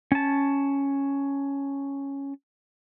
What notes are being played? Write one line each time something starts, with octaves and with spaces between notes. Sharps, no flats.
C#4 A5